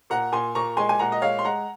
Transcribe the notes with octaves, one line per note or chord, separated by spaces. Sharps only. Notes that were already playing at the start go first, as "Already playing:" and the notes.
A#2 F#5 A#5
A#2 G#5 C6
A#2 A#5 C#6
G#3 G#5 C6
G#5
A#2 F#5 A#5
D#5
G#3 C#5 F5
C6
G#3 F#5 A#5